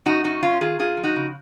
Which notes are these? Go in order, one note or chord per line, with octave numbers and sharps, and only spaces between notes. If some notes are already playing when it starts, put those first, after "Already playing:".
F#2 D#4 F#4
F#2 D#4 F#4
F#2 C#4 F4
D#3 F4 G#4
F#2 F4 G#4
F3
D#4 F#4
C#3